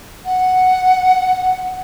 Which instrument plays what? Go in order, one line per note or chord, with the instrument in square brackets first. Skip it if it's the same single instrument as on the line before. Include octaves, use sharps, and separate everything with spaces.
[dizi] F#5